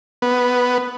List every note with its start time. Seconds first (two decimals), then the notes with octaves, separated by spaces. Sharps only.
0.22 B3